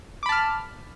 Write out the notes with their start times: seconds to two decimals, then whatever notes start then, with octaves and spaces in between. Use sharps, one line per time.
0.23 D6
0.26 B5
0.29 A5
0.32 F6